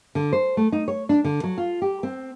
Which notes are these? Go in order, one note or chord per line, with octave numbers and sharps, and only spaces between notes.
D3
C5
A3
D#4
C#5
D4
D3
F#3
F4
G4
C4